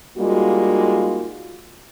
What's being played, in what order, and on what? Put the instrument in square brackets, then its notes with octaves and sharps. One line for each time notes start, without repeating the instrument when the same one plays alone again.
[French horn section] G3 G#3 A#3 D#4 F4 F#4